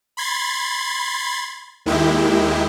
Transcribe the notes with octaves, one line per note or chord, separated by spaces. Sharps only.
B5 C6 G#6 A6
D#2 D#3 G#3 E4 G4